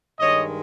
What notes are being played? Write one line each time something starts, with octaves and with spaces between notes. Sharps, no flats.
G2 D#3 G#3 C#5 D#5